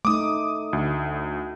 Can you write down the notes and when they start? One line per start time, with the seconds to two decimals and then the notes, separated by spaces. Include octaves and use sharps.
0.05 A3 D#4 D6 D#6
0.73 D2